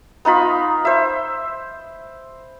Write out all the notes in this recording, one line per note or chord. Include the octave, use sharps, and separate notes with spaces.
B3 D#4 F4 B5
C5 E5